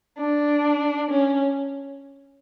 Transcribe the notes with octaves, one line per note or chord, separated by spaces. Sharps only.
D4
C#4